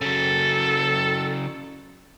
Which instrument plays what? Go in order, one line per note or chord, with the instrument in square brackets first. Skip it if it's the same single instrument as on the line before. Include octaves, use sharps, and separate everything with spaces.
[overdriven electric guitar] C#3 F#3 [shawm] A4